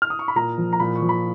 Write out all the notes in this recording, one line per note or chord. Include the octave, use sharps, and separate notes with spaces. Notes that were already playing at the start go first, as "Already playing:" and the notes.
F6
D#6
C#6
B5
A#2 A#5
F3
A#5
A#2 B5
C#6
F3
B5